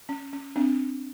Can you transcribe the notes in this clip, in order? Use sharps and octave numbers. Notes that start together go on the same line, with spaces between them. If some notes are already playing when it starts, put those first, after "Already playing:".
C#4
C#4
C4 D4